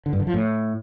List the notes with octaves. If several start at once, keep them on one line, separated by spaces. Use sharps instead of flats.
D3
G2
D3
F3
A2